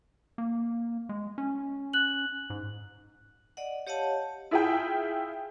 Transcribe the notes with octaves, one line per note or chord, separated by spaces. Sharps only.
A#3
G#3
C#4
F#6 F#7
G#2
D5 D#5 F#5
G4 C#5 D#5 F5 F#5 A5
E4 F4 G#4 E5 G5